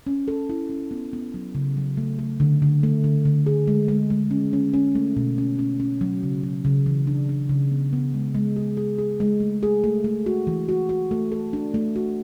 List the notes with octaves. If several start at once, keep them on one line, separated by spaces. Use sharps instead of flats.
C#4
A4
E4
C#4
B3
B3
F#3
C#3
F#3
A3
A3
D3
D3
A3
D3
D3
G#4
G#3
G#3
G#3
C#4
C#4
C#4
A3
B2
C#4
C#4
C#4
F#3
C#3
F#3
C#3
E3
D4
D4
C#3
B3
B3
G#3
G#3
G#4
G#4
G#4
G#3
A3
G#4
A3
A3
F#4
E3
F#4
F#4
A3
A4
D4
A3
F#4